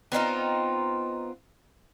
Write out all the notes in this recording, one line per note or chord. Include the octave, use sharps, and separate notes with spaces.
B3 C4 D#4 F4